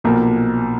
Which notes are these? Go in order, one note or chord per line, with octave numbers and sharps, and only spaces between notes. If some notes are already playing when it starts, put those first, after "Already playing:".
B1 A#2 F3 A#3